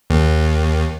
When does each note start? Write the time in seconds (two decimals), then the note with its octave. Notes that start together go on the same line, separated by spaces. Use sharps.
0.10 D#2